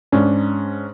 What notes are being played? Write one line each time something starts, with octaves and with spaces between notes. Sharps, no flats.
G#2 C#4 D4